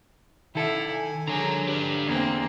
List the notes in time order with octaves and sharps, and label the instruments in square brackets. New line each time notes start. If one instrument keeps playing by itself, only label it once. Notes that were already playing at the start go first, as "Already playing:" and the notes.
[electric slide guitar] D#3 A4 [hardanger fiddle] E4 F5
[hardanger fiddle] G#5
[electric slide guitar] D3 [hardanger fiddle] G#4 A#4 [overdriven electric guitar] C#5 A#5
[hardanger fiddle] D4 [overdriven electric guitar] G4 B4
[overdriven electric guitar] E2 [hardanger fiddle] A#3 C4